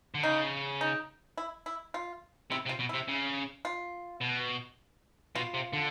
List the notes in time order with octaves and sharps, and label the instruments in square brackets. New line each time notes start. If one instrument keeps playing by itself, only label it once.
[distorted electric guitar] D3
[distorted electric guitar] C#3 [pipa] D#4
[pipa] D#4
E4
E4
F4
[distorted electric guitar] C3 [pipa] E4
[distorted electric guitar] C3
[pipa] F4
[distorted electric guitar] B2
[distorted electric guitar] C3 [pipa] E4
[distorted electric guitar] C#3
[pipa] F4
[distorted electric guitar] B2
[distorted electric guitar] B2 [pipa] F4
[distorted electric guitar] C3
D3